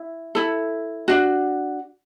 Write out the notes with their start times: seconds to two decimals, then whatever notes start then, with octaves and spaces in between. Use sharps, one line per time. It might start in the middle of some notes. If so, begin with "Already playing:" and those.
Already playing: E4
0.35 E4 A4
1.08 D4 F#4